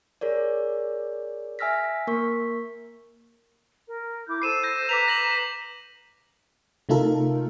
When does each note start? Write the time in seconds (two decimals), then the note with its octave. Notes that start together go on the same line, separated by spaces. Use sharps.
0.21 G#4 A#4 C#5 D5
1.59 E5 G#5 E6 F6 A#6 B6
2.07 A#3 A#4 C#6 B6
3.87 A#4
4.27 E4 D6 G6
4.42 A4 C5 E6 C7 D#7 E7
4.63 G6 A#6
4.89 B4 A#5 D6 B6 F7
5.08 A#6 F#7
6.89 C3 A3 D#4 F4 A4 A#4